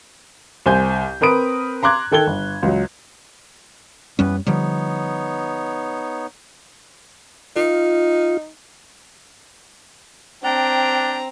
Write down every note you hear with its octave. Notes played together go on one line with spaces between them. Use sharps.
C2 C5 G#5 G6
C4 A#4 B4 D#6 D7
A#5 C6 D6 F#6 G#6
D#3 A4 G5 G#6 G7
G1
C#2 F#3
F#2 E3 G3 B3 C#4 B4
D3 F3 G3 B3 D#4 C#5
D#4 F4
C4 D4 G5 A#5